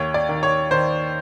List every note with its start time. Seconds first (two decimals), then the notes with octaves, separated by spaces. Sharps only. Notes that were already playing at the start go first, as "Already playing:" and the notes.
Already playing: D#2 C#5
0.14 D5
0.29 D#3
0.43 C#5
0.71 D#3 C5